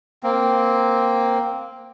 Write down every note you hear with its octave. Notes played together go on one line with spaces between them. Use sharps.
A#3 C4